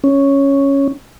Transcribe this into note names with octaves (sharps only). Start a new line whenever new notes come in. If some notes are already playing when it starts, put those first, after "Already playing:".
C#4